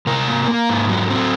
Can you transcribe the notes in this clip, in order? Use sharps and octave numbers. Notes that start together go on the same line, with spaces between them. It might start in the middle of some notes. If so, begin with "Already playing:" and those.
C3 A#4
A#3
A#3
G#2
F#3
C4